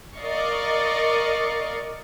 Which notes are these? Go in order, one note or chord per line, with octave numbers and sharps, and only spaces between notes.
A#4 D5 D#5 F5 C#6